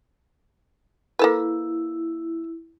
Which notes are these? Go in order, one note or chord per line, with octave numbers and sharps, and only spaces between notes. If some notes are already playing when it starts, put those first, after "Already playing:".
A#3 E4 A4 B4